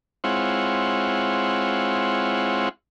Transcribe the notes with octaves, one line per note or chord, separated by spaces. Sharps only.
G#3 C4 E4 F4 C#5 F#5